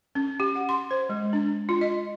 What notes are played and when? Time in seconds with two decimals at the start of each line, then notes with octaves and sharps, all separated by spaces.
0.15 C#4
0.40 G4
0.55 F#5
0.69 C6
0.91 C5
1.09 G#3
1.33 D4
1.69 F4
1.81 D#5